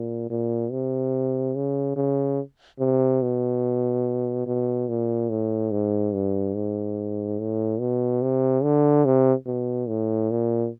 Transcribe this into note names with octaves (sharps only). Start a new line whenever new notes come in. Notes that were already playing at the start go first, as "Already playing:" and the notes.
Already playing: A#2
A#2
C3
C#3
C#3
C3
B2
B2
A#2
A2
G#2
G2
G#2
A2
B2
C3
D3
C3
B2
A2
A#2